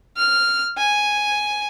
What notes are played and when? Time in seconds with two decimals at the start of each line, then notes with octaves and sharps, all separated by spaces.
0.17 F6
0.78 G#5